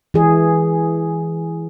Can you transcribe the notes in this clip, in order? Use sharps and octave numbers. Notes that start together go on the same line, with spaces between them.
E3 G#4